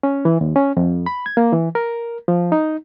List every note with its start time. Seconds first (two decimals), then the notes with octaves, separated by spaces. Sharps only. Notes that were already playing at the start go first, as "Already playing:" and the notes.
0.03 C#4
0.25 E3
0.41 D#2
0.56 C#4
0.77 F2
1.06 B5
1.26 G#6
1.37 A#3
1.53 E3
1.75 A#4
2.28 F3
2.52 D#4